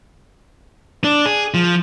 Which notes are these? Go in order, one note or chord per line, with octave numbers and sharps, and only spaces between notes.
D4
G#4
F3